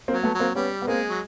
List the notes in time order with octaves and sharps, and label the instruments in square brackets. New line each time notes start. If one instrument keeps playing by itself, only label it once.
[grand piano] A#3 C4
[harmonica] F#3
[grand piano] A3 B3
[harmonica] F#3
[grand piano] A#3 C4
[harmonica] G3 [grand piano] B3 C#4
[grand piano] B3
[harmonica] G#3 [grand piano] A#3 C4
[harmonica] F#3